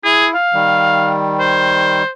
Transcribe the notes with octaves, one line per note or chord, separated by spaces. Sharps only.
E4 G#4
F5
D#3 G3
C5